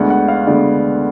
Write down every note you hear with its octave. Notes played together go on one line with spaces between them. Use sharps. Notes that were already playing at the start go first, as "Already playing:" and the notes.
Already playing: D2 D3 G#3 B3 F#5
F#5
F5
D2 D3 G#3 B3 D5